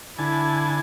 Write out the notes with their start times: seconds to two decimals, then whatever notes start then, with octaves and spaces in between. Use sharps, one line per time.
0.18 D3 E4 G#5 A5